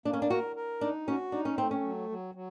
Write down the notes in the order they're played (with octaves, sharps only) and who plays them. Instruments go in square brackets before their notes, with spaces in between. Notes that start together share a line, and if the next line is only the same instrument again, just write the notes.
[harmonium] A#3 [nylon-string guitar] D4
[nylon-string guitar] C#4
D4
[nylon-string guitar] F#4 [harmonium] A#4
[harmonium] A#4
[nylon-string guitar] D4 [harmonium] D#4
[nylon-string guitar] C#4 [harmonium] F#4
[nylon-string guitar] D4 [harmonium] D#4
[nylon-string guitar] C#4
[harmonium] A3 [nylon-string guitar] C4
[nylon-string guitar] C#4
[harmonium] F#3
F#3
F#3